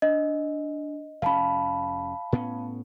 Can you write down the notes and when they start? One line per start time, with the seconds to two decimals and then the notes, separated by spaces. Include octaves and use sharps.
0.02 D4 D#5
1.22 F1 C#4 F5 A5 B5
2.32 A2 B3 C#4